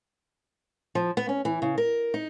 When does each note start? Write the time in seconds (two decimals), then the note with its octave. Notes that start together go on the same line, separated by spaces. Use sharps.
0.95 F3
1.17 B3
1.29 C#4
1.45 E3
1.62 C#3
1.78 A#4
2.14 D#4